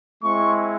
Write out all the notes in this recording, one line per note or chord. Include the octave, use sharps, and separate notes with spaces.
G#3 C4 E4 C#6